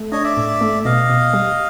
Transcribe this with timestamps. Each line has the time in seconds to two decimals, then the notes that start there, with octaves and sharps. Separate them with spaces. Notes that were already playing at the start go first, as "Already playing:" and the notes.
Already playing: A3
0.12 D4 C#5 D#5
0.24 D5 E5
0.37 A2
0.61 A3
0.85 B2 D#5 F5
1.10 B2
1.33 G3